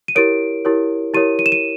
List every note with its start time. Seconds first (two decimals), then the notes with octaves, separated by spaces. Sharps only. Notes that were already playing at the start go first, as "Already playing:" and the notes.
0.08 D#7
0.16 E4 G4 A#4 C#5 D7
0.65 E4 G4 A#4 C#5
1.14 E4 G4 A#4 C#5 D#7
1.39 D#7
1.46 E7
1.52 D#7